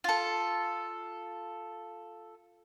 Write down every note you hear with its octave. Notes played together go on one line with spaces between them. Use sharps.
F4 A4